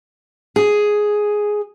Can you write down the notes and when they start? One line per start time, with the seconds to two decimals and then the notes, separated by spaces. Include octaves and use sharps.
0.56 G#4